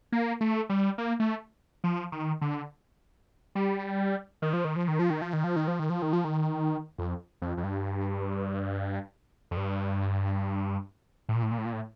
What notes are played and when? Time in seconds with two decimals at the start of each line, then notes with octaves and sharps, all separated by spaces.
0.12 A#3
0.41 A3
0.70 G3
0.98 A#3
1.20 A3
1.84 F3
2.12 D#3
2.41 D3
3.55 G3
4.42 D#3
4.53 F3
4.65 D#3
4.76 F3
4.88 D#3
4.99 F3
5.10 D#3
5.22 F3
5.33 D#3
5.44 F3
5.56 D#3
5.68 F3
5.79 D#3
5.90 F3
6.02 D#3
6.13 F3
6.24 D#3
6.98 F2
7.42 F2
7.57 F2
7.64 G2
9.51 F2
9.57 G2
11.29 A2
11.35 A#2
11.43 A2
11.51 A#2
11.58 A2
11.65 A#2
11.73 A2